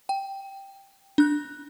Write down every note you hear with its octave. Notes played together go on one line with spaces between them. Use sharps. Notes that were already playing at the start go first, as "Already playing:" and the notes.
G5
D4 F#6